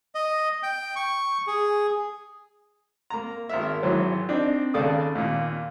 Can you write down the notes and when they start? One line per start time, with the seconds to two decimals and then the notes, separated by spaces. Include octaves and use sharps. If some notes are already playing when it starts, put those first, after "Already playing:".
0.15 D#5
0.63 G5
0.96 C#6
1.47 G#4
3.10 A#3 A#5
3.49 G#1 A#4 E5
3.83 G#1 E3 F#3 C#5
4.29 C4 D4 D#4
4.74 D#2 C#3 A4 D5 A5 D#6
5.15 D#2 A#2